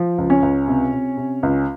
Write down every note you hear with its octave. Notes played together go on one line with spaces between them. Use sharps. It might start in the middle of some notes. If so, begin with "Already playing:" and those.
Already playing: F3
C#2
C#4
C#2
C3
C3
C3
C#2